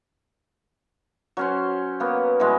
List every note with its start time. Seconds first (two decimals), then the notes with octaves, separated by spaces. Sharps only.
1.37 F#3 C#4 C5
2.00 A#3 B3
2.40 B2 E3 G3 G#3